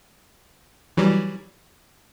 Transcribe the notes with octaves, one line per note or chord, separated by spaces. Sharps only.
E3 F#3 G3